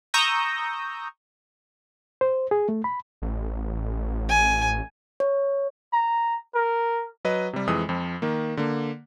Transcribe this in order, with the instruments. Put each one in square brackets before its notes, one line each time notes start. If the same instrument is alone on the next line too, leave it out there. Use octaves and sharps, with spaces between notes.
[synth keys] A#5 C#6 D#6 E6 G6 A#6
[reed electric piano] C5
G#4
A3
B5
[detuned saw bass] A1
[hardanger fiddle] G#5
[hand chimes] C#5
[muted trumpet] A#5
A#4
[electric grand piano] F#3 B4 D#5
C3 G3
F2 E3 G#3 D#6 E6
F2 F3
D#3 A#3
D3 A#3